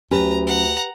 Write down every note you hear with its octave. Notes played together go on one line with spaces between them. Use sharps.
D2 F#3 C#4 G4 B4 A#5
F#5 A#5